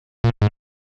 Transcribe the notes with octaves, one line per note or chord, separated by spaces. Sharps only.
A#2
G#2